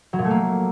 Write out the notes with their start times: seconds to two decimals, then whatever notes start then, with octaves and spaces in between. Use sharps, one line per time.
0.13 F#3
0.19 A#2
0.24 A3
0.30 A#3